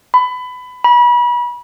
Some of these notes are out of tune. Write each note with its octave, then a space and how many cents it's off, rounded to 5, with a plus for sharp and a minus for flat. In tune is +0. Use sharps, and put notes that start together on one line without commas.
B5 +20
B5 -35